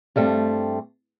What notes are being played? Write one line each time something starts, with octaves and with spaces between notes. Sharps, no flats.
G2 G3 A3 C4